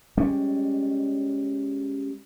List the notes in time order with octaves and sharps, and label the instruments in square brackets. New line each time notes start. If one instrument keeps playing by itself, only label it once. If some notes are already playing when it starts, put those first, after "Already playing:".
[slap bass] G3 G#3 C#4